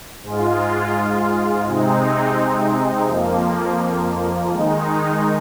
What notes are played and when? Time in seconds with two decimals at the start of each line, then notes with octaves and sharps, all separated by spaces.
0.23 G#2 G#3 F4
1.66 C3 G#3 C4 D#4
3.08 F2 F3 A#3
4.50 D#3 G#3 D#4